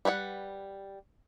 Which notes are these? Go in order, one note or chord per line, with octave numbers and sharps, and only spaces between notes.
G3 B4 C#5 F#5